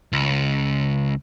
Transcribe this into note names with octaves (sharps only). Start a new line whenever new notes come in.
C#2